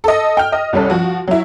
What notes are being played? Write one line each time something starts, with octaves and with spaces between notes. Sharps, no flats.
A4 D#5
G5 F6
D#5
C2 G3 C#4 A4
F3 F#4
F#3 E4